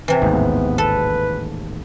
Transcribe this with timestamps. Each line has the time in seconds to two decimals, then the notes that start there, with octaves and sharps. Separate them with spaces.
0.08 C3 E3
0.22 A1 D#2 G#2 B3
0.78 A4 B4